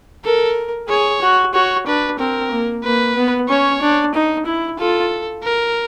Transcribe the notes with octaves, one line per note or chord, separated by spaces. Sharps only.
A4 A#4
G#4 C#5
F#4
F#4 C#5
D4 B4
C4 A#4
A#3
A#3 B4
B3
C#4 C#5
D4
D#4
E4
F4 A4
A#4